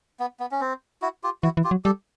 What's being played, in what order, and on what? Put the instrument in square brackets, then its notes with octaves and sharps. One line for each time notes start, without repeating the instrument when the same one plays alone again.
[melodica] B3
B3
C#4
C4
E4 F#4
F4 G4
[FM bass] E3 [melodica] E4 F#4
[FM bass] E3
[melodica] F4 G4
[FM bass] F#3
[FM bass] G3 [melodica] G4 A4